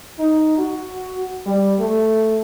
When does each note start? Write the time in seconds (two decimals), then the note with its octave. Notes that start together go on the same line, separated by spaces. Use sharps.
0.19 D#4
0.58 F#4
1.46 G3
1.79 A3